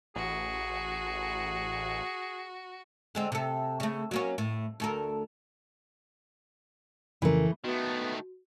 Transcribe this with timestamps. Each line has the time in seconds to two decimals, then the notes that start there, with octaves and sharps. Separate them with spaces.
0.16 A1 F#4 G#4
3.15 D3 G#3 C4
3.32 C3 A4
3.80 C#3 A3
4.11 F#3 A#3 C#4
4.38 A2
4.80 D2 A4 A#4
7.22 F2 C#3 E3 A3 A#4
7.64 D#3 A3 B3 F#4